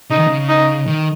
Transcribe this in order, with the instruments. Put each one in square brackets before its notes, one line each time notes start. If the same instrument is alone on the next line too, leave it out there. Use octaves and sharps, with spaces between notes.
[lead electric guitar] C#3 [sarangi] D#4
[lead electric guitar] D#3
C#3
[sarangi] D#4
[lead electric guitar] D#3